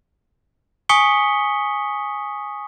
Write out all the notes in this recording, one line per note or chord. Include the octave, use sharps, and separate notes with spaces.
G#5 C#6 D#6 B6 C#7 G7